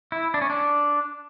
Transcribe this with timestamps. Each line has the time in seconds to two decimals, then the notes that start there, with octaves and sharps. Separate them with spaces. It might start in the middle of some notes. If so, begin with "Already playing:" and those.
0.12 E4
0.34 D4
0.41 C#4
0.50 D4